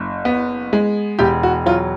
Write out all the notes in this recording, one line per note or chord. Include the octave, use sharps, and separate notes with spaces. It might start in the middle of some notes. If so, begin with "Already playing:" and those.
Already playing: F#1
B3
G#3
E1 G4
F#4
F#3 F4